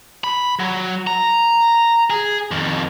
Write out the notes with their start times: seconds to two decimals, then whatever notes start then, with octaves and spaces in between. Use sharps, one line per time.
0.24 B5
0.60 F#3
1.07 A#5
2.10 G#4
2.51 F2 D#3